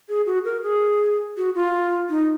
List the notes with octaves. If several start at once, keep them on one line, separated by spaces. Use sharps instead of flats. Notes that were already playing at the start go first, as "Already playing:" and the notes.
G#4
F#4
A#4
G#4
F#4
F4
D#4